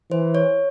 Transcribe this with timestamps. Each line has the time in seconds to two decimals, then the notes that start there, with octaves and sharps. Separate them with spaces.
0.11 E3 C5
0.35 C#5